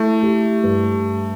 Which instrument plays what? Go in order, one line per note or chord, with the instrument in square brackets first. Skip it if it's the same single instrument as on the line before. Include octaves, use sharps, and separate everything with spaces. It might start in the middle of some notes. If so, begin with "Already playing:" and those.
Already playing: [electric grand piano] A3 [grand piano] E4
[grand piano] G4
G2